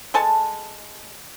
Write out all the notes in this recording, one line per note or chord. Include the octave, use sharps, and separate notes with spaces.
G#3 A4 G#5 A5